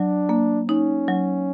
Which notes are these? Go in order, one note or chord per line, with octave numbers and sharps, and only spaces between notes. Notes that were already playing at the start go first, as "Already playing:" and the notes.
Already playing: F#3 D4
A#3
C#4 D#4
F#3